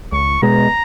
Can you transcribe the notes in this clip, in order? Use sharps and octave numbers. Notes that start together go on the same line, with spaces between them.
C#2 C#6
B2 G#3 B3 A#5